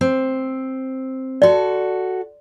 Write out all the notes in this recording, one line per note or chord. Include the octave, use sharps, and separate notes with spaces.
C4
F#4 A4 D5 C6